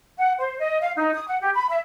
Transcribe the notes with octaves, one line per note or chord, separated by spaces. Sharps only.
F#5
C5
D#5
F5
D#4
D#6
F#5
G4
B5
E5